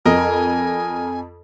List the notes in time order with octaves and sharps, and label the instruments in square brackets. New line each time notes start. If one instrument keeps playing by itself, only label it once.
[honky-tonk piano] F2 [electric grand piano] A#4 D#5 [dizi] G#5